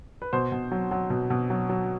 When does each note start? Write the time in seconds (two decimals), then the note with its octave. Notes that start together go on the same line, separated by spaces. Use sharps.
0.22 B4
0.33 B2 C5
0.52 B2
0.71 F#3
0.91 F#3
1.10 B2
1.30 B2
1.50 F#3
1.69 F#3